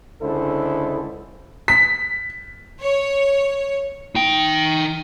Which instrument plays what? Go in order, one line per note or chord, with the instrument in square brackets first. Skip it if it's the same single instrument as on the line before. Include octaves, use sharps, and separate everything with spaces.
[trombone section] C#2 D3 E4 A4 C5
[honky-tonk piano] B6
[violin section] C#5
[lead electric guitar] D#4 G5